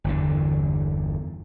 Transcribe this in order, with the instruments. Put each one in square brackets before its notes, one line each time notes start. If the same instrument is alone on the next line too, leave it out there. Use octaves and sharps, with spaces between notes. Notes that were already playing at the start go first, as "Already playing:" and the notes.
[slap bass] G1 E2 D3